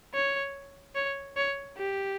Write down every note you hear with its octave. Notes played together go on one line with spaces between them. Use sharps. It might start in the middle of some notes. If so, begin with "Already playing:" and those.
C#5
C#5
C#5
G4